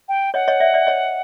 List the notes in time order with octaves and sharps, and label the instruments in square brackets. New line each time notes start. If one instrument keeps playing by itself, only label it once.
[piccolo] G5
[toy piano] C#5 D#5 [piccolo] F#5
[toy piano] C#5 D#5
D5 E5
D5 E5
C#5 D#5